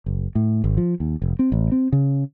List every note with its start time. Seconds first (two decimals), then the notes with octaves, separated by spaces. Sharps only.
0.06 F#1
0.35 A2
0.64 G#1
0.77 F3
1.00 D#2
1.22 F1
1.39 C4
1.52 A1
1.72 C4
1.92 C#3